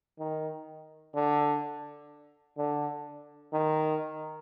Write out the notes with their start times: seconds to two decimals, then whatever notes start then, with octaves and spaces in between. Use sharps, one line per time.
0.19 D#3
1.15 D3
2.57 D3
3.53 D#3